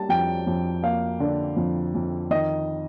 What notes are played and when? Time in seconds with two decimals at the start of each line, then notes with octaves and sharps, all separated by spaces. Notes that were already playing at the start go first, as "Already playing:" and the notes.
Already playing: G3 A#3 A5
0.09 F2 G5
0.47 F2
0.83 A#3 F5
1.20 D3
1.57 F2
1.95 F2
2.31 D#3 D#5